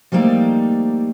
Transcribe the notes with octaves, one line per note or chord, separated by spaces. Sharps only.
F3 G3 A3 A#3 D#4